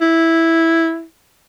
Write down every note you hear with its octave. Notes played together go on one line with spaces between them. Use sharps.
E4